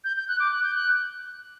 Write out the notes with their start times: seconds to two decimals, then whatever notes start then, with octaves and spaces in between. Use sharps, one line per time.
0.04 G6
0.17 G6
0.28 F#6
0.40 D6
0.52 F#6
0.63 G6
0.75 F#6